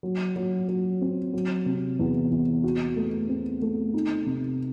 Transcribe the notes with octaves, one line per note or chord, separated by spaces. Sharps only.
F#3
F#3
F#3
C4
F#3
C3
E2
E2
F#4
A3
C4
A3
D#4
C3